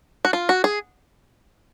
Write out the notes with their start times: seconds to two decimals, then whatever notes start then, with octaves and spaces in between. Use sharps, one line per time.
0.25 F#4
0.33 F4
0.49 F#4
0.64 G#4